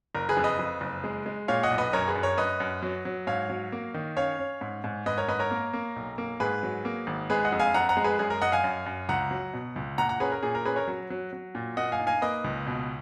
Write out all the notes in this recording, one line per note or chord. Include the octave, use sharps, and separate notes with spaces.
F#1 A#4
G#4 B4
F2
B4 D#5
F2
F#1
G#3
G#3
A#2 C#5 F5
D#5 F#5
B1
B4 D#5
F#2 A#4 C#5
G#4 B4
F#2
A#4 C#5
F#2 B4 D#5
F#2
F#3
F#3
G#2 C#5 F5
F#3
A#3
D#3
C#4 C#5 F5
C#4
G#2
G#2
G#2 B4 D#5
A#4 C#5
G#2 B4 D#5
A#4 C#5
A#3
A#3
B1
A#3
G#2 G#4 B4
F#3
A#3
G#1
G#3 G#4 B4
D#5 F#5
F2
F5 G#5
F2 F#5 A#5
F#5 A#5
G#3
G#4 B4
F#2 G#4
A#4
F#2 D#5 F#5
F5 G#5
F#2
F#2
C#2 F#5 A#5
F#3
B2
C#2
A#2 F#5 A#5
F#5 A#5
C#4 G#4 B4
A#4
A#2 G#4
A#4
C#4 G#4 B4
A#4 C#5
F#3
F#3
F#3
A#2
A#3 D#5 F#5
F5 G#5
D#4
F5 G#5
A#3 B4 D#5
C#2
B2